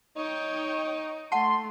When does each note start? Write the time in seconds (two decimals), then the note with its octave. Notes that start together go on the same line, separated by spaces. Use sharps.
0.17 D#4 C#5 G5
1.32 A3 F#5 A5 C6